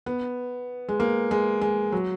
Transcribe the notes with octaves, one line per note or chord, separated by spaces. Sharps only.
B3
G#3
A#3
G#3
G#3
F#3